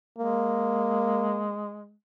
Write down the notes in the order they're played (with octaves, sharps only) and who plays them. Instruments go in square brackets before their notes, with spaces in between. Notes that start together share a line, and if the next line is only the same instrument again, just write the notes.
[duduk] G#3 [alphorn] A#3